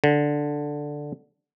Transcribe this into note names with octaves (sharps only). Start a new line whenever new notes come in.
D3